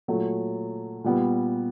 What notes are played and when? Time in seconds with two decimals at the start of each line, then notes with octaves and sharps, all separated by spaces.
0.08 A#2 F#3 A3
1.04 A#2 G3 B3